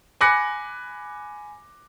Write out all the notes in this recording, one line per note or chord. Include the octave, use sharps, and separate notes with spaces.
G#5 B5 D6 F#6 A#6 C#7